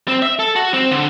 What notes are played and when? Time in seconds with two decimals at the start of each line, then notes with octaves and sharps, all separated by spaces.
0.08 C4
0.22 E5
0.39 A4
0.56 F#4
0.74 C4
0.91 D3